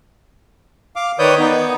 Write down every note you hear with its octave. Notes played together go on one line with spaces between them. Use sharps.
F5 D6
D#3 B4 C#5 D5 D#6 G6
B3 D#4